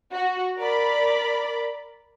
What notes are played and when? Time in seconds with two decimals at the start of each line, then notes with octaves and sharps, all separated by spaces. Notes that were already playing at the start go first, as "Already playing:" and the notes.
0.14 F#4
0.59 A#4 D5 B5